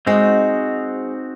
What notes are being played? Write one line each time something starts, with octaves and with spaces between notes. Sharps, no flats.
G#3 C4 D#4 F#4 C5